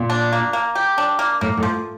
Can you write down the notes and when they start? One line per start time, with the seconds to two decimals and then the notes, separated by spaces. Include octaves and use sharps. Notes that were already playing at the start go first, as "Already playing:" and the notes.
Already playing: A#2
0.10 D4
0.33 A#3
0.53 A#3
0.75 G4
0.98 D4
1.19 A#3
1.41 A2 A#3
1.57 A2
1.63 F3